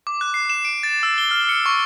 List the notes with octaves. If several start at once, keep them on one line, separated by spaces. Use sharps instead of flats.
D6
F#6
C7
E7
D7
A6
E6
G7
F6
C#7
C#6